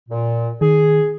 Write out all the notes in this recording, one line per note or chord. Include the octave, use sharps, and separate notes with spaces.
A#2
D#3 G#4